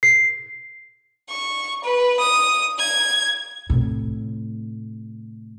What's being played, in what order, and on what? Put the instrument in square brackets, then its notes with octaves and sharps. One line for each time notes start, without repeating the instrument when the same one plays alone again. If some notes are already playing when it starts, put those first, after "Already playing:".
[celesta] C7
[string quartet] C#6
B4
D#6
G#6
[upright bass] A2 C3